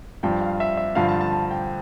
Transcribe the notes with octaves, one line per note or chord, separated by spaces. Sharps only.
G2 F3 G5
F5
E5
E5
G2 D3 F3 F5
A5
A5
A5
G5